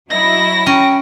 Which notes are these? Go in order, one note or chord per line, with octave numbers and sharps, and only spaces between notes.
F#3 E4 D#5 A#6
C#4 G5